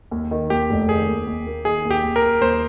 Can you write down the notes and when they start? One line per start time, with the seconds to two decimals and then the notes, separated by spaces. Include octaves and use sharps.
0.11 D#2
0.31 D#3
0.50 D#2 G4
0.70 F1
0.88 D#3 G#4
1.08 D#2
1.27 D#2
1.47 A#3
1.65 D#3 G#4
1.85 D#2
1.91 G4
2.03 D#2
2.16 A#4
2.22 D#2
2.41 D#2 C5